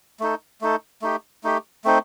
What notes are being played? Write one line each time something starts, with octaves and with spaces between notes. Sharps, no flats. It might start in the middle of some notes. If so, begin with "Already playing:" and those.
A3 D#4 A4
A3 D#4 A4
A3 D#4 G4
A3 D#4 G4
A3 C4 D#4